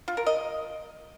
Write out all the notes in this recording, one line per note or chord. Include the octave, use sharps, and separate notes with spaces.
F4
A#4
D#5